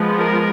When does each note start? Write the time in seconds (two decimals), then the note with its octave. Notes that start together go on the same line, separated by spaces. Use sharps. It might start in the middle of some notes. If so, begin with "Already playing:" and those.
Already playing: F3 G#3 B3
0.18 A#4